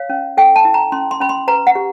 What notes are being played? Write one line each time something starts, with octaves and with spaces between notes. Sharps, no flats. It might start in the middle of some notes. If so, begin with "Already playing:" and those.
Already playing: C#5 F5
C#4
A4 G5
A5
E4
A#5
C#4 C6
C6
C#4 B5
C6
B4 A#5
F#5
G4